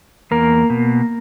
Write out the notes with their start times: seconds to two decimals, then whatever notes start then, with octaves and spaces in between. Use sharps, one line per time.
0.31 E2 A#3 A#4
0.70 B2